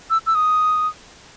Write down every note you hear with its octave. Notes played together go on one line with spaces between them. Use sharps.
E6
E6
D#6